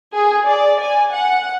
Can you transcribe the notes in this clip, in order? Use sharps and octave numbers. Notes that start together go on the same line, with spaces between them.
G#4
D5
G#5
F#5